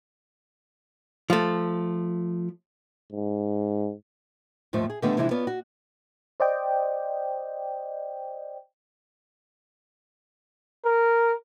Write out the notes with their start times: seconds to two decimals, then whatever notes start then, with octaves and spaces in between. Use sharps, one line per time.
1.30 F3 A3
3.13 G#2
4.73 D#2 G#2 F3 A3
4.90 G#4
5.02 D3 D#3 G3 A3 B3 C#4
5.17 C3 E3 F3 G#3 D4 E4
5.31 B3 C#4 F4 D5
5.47 F#4
6.40 C5 D5 D#5 G5
10.86 A#4